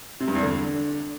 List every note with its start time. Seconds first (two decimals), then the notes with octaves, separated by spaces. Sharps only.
0.20 C3
0.28 G2
0.35 E2
0.42 D3